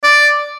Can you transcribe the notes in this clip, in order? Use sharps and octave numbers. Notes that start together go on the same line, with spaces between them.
D5